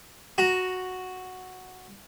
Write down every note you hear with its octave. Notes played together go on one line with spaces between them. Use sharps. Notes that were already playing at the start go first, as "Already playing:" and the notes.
F#4 A#5